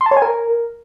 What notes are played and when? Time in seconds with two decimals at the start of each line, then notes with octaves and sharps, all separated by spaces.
0.01 C6
0.06 A5
0.11 C#5
0.17 G#5
0.22 A#4